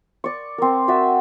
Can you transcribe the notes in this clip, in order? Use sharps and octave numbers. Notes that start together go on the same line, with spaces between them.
D5 C#6
C4 A#4
F#4 D5 E5